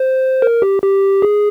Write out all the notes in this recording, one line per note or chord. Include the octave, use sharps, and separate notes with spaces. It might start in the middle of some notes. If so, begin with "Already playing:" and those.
Already playing: C5
A#4
G4
G4
G#4